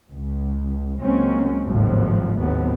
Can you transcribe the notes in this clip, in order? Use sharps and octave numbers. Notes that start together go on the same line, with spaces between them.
C#2
C#2 F#3 G#3 A#3 C4 C#4
G#1 D#2 A2 C#3 F3 F#3
D#2 A2 F#3 B3 C4